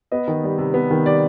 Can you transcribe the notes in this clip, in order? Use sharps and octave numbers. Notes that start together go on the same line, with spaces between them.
B3 D#5
D#3
G3
C3
B3
D#3
G3 D5